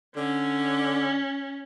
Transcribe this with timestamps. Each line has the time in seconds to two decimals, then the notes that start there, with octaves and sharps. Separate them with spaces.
0.16 D3 C#4